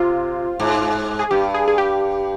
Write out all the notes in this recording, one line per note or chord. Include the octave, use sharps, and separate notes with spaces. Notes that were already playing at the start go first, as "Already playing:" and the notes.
Already playing: C3 F4
G#2
G#4
G2 G4
G#4
G#4
G4